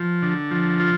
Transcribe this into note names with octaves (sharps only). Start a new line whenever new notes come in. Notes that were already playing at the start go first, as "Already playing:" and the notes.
Already playing: F3
D3
F3
F4